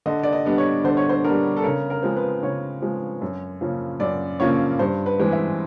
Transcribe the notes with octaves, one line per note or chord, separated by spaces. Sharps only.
D3 D#5
D5
D#5
G3 B3 D4
C#5
D3 C5
C#5
C5
G3 B3 D4 A#4
A4
C#3 A#4
A#4
F3 G#3 C4
B4
C#3 C#5
F3 G#3 C4
F#2
C#3 F3 A#3 C#4
F#2 D5
C#3 F3 A#3 C#4 C#5
G2 C5
B4
E3 G#3 C4
E5